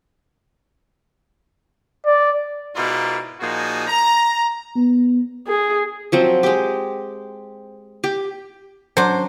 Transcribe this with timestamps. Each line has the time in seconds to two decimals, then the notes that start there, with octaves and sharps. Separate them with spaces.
2.06 D5
2.76 G#2 B2 E4 F4 A#4 D5
3.40 A#2 F3 D#4 F#4 G#4
3.88 A#5
4.76 B3
5.47 G#4
6.12 F3 F#3 C4
6.43 G#3 G4
8.04 G4
8.97 F#3 D4 C5